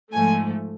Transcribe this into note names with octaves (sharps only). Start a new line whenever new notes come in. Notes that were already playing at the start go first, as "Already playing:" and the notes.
G#2 F3 A3 G#5